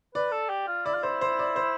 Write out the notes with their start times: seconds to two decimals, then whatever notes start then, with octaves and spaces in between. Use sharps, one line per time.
0.15 B4 D5
0.32 A4
0.50 G4
0.68 F4
0.86 E4 D5
0.94 F4
1.03 E4 C5
1.21 C5
1.39 D5
1.56 C5